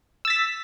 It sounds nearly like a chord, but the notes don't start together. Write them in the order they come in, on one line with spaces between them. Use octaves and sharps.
E6 A6 B6